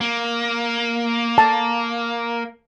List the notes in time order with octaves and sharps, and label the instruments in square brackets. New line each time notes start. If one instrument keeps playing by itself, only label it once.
[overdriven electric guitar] A#3
[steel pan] A5